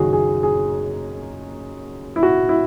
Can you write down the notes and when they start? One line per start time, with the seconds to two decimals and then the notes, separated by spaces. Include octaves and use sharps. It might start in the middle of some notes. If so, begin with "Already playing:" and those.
Already playing: F#1 F#2 D#3 F#3 F#4 G#4
0.13 G#4
0.43 G#4
2.16 E4
2.23 F#4
2.49 E4